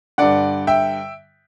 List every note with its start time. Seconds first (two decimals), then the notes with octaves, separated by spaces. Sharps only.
0.18 G2 D3 D5 F#5
0.67 E5 G5